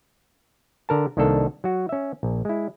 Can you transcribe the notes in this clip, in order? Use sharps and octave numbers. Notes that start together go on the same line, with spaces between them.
D3 A#4 A5
C2 D#3 A#3 D4 A4
F#3 F#4
C#4 E5
A#1
G#3 E4